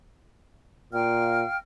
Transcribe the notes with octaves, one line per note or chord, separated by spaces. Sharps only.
A#2 F5 G5 F6